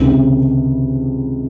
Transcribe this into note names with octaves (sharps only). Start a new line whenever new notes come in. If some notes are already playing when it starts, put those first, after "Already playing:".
Already playing: C#2 C3 D#3